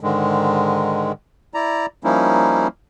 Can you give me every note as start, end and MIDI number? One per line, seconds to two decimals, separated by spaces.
0.01 1.12 44
0.01 1.12 50
0.01 1.12 51
0.01 1.12 56
1.54 1.86 64
1.54 1.86 74
1.54 1.86 82
2.04 2.68 53
2.04 2.68 55
2.04 2.68 58
2.04 2.68 61
2.04 2.68 63
2.04 2.68 64